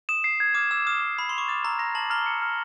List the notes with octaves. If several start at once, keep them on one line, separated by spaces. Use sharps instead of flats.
D#6 E7
C7
G#6
D6 F6
D6 E6
D#6 F6
D6
B5 G#6
C6 F7
C#6
D6 A6
A#5 E6
A#5 A#6
A5 F#7
A#5 F6
C#7
F6